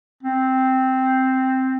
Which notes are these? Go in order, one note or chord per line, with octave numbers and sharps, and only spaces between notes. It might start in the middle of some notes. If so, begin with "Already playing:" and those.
C4